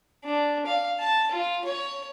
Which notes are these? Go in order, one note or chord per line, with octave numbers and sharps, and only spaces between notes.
D4
F5
A5
F4
C#5